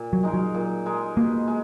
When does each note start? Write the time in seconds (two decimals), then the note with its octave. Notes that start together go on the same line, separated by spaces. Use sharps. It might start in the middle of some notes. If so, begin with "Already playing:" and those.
Already playing: A#2
0.13 F#3
0.23 G#3 D#4 A#4
0.34 F#3
0.55 A#2
0.86 G#3 D#4 A#4
1.16 B2 A#3
1.48 G#3